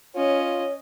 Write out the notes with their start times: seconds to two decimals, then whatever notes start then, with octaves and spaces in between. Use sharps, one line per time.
0.15 C#4 F4 C#5 D#5